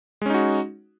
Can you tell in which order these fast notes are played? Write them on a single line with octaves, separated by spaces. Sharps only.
G#3 C#4 D#4 F#4